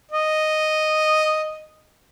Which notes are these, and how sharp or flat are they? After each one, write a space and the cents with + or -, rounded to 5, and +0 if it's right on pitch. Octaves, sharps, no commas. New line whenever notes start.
D#5 -5